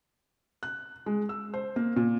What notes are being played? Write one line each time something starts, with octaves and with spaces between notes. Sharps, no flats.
F#6
G#3
E6
C5
A#3
A#2